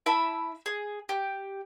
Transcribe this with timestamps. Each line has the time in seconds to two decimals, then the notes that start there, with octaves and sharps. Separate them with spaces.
0.06 E4 E5 A5 B5
0.66 G#4
1.09 G4